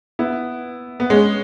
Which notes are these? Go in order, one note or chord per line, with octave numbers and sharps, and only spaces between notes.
B3 E4
B3
G#3 C#4